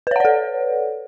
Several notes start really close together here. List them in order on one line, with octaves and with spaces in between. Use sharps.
B4 C#5 F#5 D5 A4